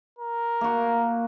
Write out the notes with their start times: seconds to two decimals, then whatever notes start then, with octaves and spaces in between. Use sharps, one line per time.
0.19 A#4
0.61 A#3 F#4